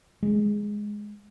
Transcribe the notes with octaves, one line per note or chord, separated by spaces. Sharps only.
G#3